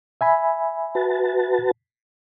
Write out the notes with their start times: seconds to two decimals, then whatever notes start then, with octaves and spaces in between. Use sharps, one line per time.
0.21 E5 G#5 B5
0.95 F#4 B4 A5